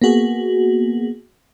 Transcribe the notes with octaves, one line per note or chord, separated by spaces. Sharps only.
A#3 B3 F#4 G#4